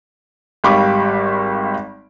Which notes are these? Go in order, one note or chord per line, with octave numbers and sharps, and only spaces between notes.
G#1 G3 F5 B5 C#6 D6